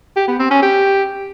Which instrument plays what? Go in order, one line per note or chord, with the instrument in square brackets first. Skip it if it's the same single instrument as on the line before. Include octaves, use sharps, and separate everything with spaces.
[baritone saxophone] G4
B3
C4
C#4
G4